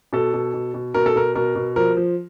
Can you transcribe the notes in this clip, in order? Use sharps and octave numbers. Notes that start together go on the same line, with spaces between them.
B2 A4
B2
B2
B2
B2 A#4
A4
B2 A#4
B2 A#4
B2
F3 A#4
F3